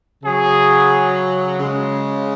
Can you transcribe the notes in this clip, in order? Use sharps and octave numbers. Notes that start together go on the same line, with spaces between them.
C#3 F#3 G#4
C#3 G#3